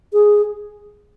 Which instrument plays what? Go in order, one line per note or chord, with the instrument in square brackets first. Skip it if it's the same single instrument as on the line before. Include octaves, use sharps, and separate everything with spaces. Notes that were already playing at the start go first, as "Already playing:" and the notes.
[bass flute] G#4